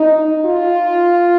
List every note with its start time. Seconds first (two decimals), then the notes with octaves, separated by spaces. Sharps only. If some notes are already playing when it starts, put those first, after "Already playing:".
Already playing: D#4
0.45 F4